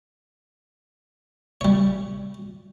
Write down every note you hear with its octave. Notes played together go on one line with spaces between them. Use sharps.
G3 C#5